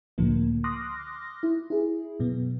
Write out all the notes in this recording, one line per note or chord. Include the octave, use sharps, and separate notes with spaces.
C#2 A2 D3 F3 A#3
C6 D6 D#6 F6 F#6 A#6
E4
E4 G#4
F#2 B2 B3